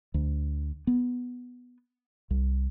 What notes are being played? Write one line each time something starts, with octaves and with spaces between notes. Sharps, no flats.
D2
B3
C2